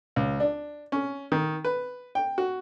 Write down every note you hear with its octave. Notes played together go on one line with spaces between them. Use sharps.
C#2
D4
C#4
D#3
B4
G5
F#4